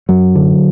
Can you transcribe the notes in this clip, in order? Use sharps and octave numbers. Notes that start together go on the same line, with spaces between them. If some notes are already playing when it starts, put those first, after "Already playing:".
F#2 F#3
D3